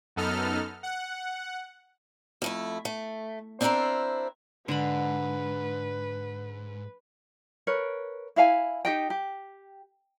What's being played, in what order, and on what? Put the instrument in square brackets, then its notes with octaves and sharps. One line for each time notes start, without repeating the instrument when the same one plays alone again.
[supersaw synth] F#2 B3 D#4 A4 F6
F#5
[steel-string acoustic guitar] F2 A3 E4
A3
C4 D4 E4 F4 A#4 C5
[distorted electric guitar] G#2 [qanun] D3 A#5 B5 [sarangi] B4
[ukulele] A#4 B4 C#5
E4 E5 F5 G#5
D#4 G4 D#5 G5
G4